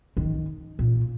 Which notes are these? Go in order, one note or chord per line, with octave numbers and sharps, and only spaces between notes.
D#3
A#2